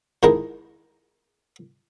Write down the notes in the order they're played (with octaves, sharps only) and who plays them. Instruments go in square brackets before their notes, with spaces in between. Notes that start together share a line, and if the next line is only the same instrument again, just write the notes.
[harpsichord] F2 D#3 G#3 E4 A#4 D#5